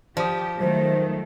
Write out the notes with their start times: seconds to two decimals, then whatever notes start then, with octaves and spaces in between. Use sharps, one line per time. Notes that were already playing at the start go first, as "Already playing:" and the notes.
0.17 F3 G4 D5 D#6
0.60 D#3 F#3 A3 C5